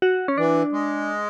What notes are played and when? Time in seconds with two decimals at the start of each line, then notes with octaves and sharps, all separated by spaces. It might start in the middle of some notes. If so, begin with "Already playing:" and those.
0.02 F#4
0.28 C#4
0.38 E3 D4
0.72 G#3